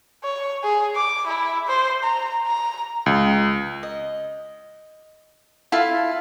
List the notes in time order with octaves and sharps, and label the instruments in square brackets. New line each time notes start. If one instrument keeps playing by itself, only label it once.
[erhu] C#5
G#4
D6
E4
C5
A#5
A#5
[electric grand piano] C#2
[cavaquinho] D#5
E4 F4 A4